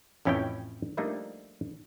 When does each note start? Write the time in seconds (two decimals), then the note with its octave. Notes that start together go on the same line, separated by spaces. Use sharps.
0.25 A1 F2 C#4 E4 C#5 G5
0.97 F3 G3 A3 A#3 D4 D#4